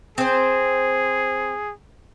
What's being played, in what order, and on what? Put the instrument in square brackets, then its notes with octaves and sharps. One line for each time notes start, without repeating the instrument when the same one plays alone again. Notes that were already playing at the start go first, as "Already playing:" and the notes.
[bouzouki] C4 C5 [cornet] G#4